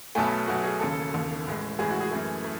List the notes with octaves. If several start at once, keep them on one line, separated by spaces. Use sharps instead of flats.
B1 B2 F#3 A3 G#5 A5
B5
B1 B2 F#3 A3 F#4
G#4
E1 D#2 C#3 A4
A4
E1 D#2 C#3
A1 A2 G#3
A1 A2 G#3 G#4
F#4
G#4
F#2 E3 A3
A3